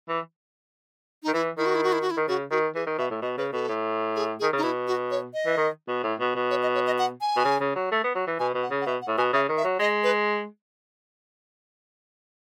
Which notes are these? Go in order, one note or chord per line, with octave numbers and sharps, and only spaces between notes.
E3
D#3 D#4
E3 E4
D#3 E4
F#4
E4
F#4
E4
F#4
E4
D#3
C#3 F#4
D#3 F#4
E3 G#4
D#3
B2 E5
A2
B2 D#5
C#3 B4
B2 A4
A2
G#4
G#4
D#3
C#3 D#4
B2 E4
F#4
C#5
D#5
E3
D#3
B2
A2
B2
B2
C#5
D#5
C#5
D#5
F#5
G#5
B2
C#3
C#3
F#3
A3
B3
F#3
E3
B2 G#5
B2
F#5
C#3
F#5
B2 E5
F#5
A2
B2 G#5
C#3 E5
D#3
E5
F#3
G#3 D#5
B4